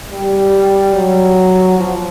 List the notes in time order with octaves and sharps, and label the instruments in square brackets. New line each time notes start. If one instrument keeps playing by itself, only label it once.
[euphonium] G3
F#3
F3